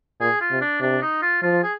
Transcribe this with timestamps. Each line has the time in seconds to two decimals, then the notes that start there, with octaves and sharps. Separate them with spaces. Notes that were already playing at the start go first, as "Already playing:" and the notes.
0.20 A#2 G#4
0.41 F4
0.51 C3
0.61 D4
0.81 C3 D4
1.02 D#4
1.22 F4
1.42 F3 F4
1.63 G#4